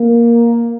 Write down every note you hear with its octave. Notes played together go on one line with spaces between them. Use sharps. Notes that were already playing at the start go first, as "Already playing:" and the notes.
Already playing: A#3